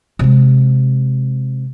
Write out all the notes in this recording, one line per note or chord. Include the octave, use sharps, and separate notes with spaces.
C3 G#3